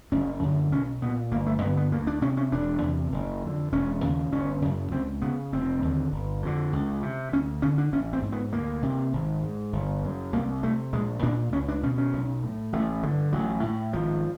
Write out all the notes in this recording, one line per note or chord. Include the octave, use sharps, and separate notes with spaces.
F#1 C#4
F#2 D3
B1 C#4
A#2 B3
G1 A#3
A3
G2 D3 B3
B3
D2 A#3
D4
C3 C#4
C#4
E1 D4
E2 C3
F#1
F2 D3
E1 C#4
D#2 C#3
G1 C#4
F#2 C#3
C#2 C4
C#3 B3
F1 C4
D#2 D3
G1
F2 D3
C#2
C3
D2 C#4
D3 C#4
D4
A1 C#4
C4
G#2
B3
D2 A#3
C3
G#1
G#2
G1
F#2 C#3
C2 A#3
C3 A3
A#1 G#3
A#2 D4
C#2 C#4
D4
B2 C#4
C#4
B1
A2
A1 A3
G2 D3 G#3
A1 F#3
A2
G#1 F3